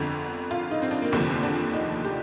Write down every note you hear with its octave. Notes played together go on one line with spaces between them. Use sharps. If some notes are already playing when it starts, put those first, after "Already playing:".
Already playing: G1 F2 D3
F4
D#4
C4
D4
A#3
F1 D#2 D3 F3 C4
C4
D4
D#4
G4